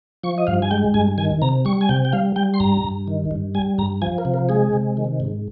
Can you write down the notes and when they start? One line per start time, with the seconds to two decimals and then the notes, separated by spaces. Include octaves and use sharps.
0.24 F3 C#6
0.38 D#5
0.47 G2 F5
0.62 G#5
0.71 G#3 G5
0.94 G2 G#5
1.18 D#3 G#5
1.42 C3 A#5
1.65 G3 C#6
1.81 G#5
1.89 C3 G5
2.05 G5
2.13 G3 F5
2.36 G3 G5
2.54 C6
2.60 G2 A#5
2.84 G2
3.08 D#3
3.31 G2
3.55 G3 G#5
3.78 G2 A#5
4.02 F3 G#5
4.18 A#4
4.25 C3
4.34 A#4
4.49 G#3 G#4
4.73 C3
4.97 D#3
5.20 G#2